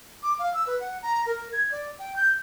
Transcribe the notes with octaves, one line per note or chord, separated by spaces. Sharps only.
D6
F5
E6
B4
F#5
A#5
A#4
G#6
D5
G5
G6